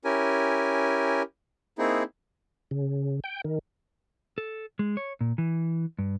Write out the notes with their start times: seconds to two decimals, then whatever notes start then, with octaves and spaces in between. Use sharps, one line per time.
0.04 C#4 E4 G4 A#4 G#5
1.78 A#3 C4 D#4 E4 G#4
2.71 C#3
3.24 G5
3.44 D#3
4.38 A4
4.79 G#3
4.97 C#5
5.21 A#2
5.38 E3
5.99 G2